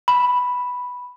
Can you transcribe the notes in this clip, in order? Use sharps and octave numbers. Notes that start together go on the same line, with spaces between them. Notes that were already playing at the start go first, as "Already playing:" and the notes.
B5